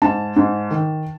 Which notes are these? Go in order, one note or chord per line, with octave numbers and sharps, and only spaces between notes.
G#2 A5
G#2
D#3